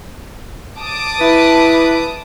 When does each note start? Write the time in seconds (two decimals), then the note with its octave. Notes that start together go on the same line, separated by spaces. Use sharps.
0.79 A5 D6 D#6
1.19 E4 B4